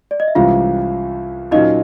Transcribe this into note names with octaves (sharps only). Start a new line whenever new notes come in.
D5
D#5
E5
C2 C3 E3 G#3 C#4 F4 F5
A#2 F#3 A#3 C#4 D#4 F4 D#5